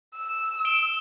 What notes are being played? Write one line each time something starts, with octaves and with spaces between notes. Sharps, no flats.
E6
D7 E7 G7